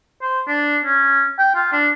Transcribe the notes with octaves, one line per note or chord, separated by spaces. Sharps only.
C5
D4
C#4
G5
F4
D4